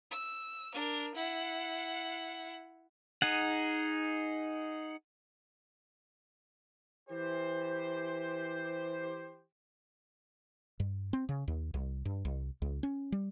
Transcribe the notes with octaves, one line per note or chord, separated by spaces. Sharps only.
E6
D4 A#4
E4 F#5
D#4 G#4 F#5
E3 G4 C5
G2
C4
C#3
D#2
C2
G2
C2
C#2
C#4
G3